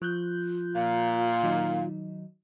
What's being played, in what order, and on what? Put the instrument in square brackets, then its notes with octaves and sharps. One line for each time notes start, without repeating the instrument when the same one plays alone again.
[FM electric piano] F3 F#6 G6 [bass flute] F4
[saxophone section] A#2 [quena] F5
[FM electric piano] D#3 F#3 D#4